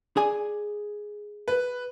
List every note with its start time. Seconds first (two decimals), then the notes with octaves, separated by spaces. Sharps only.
0.17 G#4 D5 G#5
1.48 B4